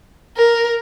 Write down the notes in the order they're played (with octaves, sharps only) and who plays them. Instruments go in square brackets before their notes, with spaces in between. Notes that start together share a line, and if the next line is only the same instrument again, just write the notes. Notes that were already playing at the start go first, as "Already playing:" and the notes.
[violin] A#4